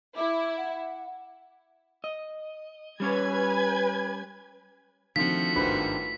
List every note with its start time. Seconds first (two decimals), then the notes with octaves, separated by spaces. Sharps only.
0.17 E4 D6
0.57 F#5
2.04 D#5
3.00 G3 C#4 B4 C#5 G#5 G#6
5.16 D3 D#3 F3 A3 C4 F4 F#4 B6
5.55 G#1 G2 B4 C5 B5